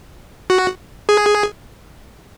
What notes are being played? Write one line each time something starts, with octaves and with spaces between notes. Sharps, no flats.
F#4
G#4